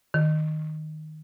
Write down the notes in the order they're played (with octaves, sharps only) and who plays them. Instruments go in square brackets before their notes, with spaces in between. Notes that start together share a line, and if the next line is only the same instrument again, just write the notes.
[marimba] D#3